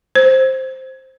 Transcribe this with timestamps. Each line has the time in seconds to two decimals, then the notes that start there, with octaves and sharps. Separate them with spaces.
0.15 C5